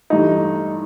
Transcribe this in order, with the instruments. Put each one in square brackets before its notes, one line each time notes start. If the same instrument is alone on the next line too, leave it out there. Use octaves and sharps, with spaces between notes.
[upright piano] G2 E3 A3 [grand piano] D#4